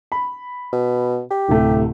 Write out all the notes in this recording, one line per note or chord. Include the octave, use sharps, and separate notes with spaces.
B5
B2
G4
D1 C3 A3